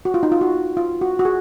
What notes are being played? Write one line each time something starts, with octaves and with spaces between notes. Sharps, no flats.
F#4
F4
D#4
F4
F#4
F4
F#4
F#4
G#4